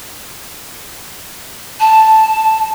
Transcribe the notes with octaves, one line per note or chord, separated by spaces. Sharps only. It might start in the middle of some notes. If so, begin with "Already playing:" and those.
A5